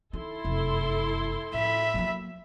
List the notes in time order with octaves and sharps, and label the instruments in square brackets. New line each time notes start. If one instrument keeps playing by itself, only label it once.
[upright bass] D#3 [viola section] E4 A4 C6
[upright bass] F1 F#2
[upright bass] A2 [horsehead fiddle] E5 B5
[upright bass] F#3 A#3